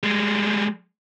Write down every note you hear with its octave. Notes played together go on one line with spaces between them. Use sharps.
G3 G#3